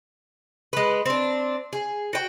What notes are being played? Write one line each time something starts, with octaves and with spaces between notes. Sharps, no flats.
G#3 B4
C4 D4
G#4
F#4 G5